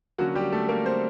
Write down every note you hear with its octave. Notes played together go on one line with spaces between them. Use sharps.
D3 F#3 A#3 C#4 F#4
G3 G4
A3 A4
A#3 A#4
C4 C5